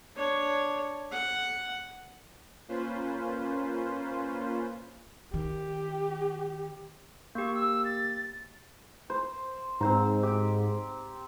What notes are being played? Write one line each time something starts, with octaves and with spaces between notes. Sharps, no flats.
D4 C#5
F#5
A#3 C#4 F4 B4 C5
D#3 G4
A#3 G4 C#6
E6
A6
C5
G#2 C4 C5 A#5
G4